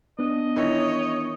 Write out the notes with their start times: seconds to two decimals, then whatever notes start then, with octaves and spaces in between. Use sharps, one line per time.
0.19 B3 D4 D#5
0.57 D#3 E3 C#5